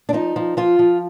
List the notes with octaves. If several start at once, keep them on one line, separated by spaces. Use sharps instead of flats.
D4
F3 D#4
F3
F3 F4
F3